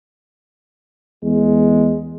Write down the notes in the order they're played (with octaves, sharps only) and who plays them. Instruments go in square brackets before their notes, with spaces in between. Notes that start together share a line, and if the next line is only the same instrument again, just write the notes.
[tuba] E2 [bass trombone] G#3